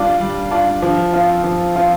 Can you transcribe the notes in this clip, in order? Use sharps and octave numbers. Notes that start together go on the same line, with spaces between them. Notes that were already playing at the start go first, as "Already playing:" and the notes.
Already playing: G3 D4 F4
G3
D4 F4
F3
C4 F4
F3
C4 F4